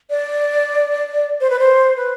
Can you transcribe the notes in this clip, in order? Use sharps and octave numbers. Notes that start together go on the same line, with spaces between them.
D5
C5
B4
C5
B4